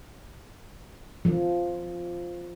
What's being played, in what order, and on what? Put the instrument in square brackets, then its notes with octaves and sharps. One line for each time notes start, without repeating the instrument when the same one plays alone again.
[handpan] F3